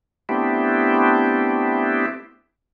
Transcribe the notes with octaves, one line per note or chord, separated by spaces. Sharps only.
A3 B3 C4 D4 E4 G4